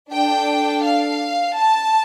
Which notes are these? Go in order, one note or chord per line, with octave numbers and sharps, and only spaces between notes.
D4 A4 G5
F5
A5